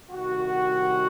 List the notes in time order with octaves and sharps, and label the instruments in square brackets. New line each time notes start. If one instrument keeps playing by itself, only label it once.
[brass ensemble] C2 C3 D#3 F#4